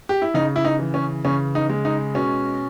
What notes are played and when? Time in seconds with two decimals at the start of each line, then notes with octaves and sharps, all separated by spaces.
0.09 G4
0.22 E4
0.34 C#3 D#4
0.56 E4
0.65 D#4
0.79 E3
0.94 C#4
1.25 C#3 C#4
1.55 D#4
1.70 G#3
1.85 D#4
2.15 B2 C#4